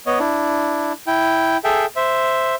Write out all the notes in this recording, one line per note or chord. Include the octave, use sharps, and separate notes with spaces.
B3 C#5 D#5
D4 E4
E4 G5
G#4 A4 E5 G5
C5 E5